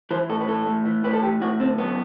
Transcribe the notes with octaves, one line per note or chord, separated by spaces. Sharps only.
E3 C5
A2 A4
B4
E3 A4
A2
E3
A2 B4
A4
E3 G4
A2 F#4
D3 C4
F#2 B3